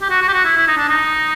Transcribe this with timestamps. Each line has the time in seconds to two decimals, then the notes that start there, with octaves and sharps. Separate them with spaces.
0.01 G4
0.10 F#4
0.22 F#4
0.28 G4
0.33 F#4
0.45 E4
0.57 E4
0.68 D#4
0.78 D4
0.88 D#4